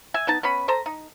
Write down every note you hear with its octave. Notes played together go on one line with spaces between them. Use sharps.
E5 G#5
B3 D#4 A5
B3 C#4 B5
A4 C5 A#5
D#4